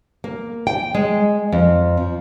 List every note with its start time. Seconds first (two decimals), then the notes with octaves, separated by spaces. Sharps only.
0.24 A#3
0.67 G5
0.95 G#3
1.53 F2
1.97 F3